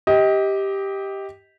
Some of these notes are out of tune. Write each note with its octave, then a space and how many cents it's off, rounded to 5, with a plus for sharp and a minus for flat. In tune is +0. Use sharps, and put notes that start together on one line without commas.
G4 +0 D#5 +25